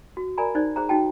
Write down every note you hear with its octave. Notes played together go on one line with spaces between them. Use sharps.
F#4
A#4 D5 G#5 A#5 B5
D#4 C5 D5
G#4 C5 A#5
D#4 F#4 G5 A5